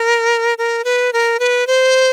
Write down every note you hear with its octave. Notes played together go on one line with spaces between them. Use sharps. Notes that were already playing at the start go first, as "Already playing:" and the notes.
Already playing: A#4
A#4
B4
A#4
B4
C5